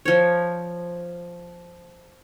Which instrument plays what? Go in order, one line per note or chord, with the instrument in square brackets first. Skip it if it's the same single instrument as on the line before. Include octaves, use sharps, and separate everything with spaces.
[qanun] F3 C#5